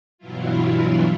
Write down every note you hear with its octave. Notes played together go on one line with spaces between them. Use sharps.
G2 B2 E3 F#3 E4 F4